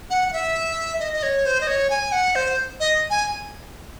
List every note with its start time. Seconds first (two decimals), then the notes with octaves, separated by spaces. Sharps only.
0.10 F#5
0.28 F#5
0.33 E5
1.00 D#5
1.13 D#5
1.23 C#5
1.46 C5
1.61 D#5
1.67 C#5
1.90 G#5
2.12 F#5
2.35 C5
2.80 D#5
3.10 G#5